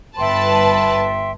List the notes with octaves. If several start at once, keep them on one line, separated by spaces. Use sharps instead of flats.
G1 B4 E5 G5 A5 C6